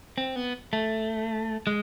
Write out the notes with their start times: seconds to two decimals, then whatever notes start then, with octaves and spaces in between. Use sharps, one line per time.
0.18 C4
0.36 B3
0.73 A3
1.67 G#3